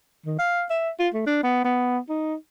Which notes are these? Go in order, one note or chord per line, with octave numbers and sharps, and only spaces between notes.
D#3
F5
E5
F4
A3
D4
B3
B3
D#4